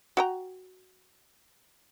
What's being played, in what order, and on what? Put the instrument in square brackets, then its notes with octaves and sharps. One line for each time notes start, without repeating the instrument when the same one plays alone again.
[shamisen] F#4 G5 A#5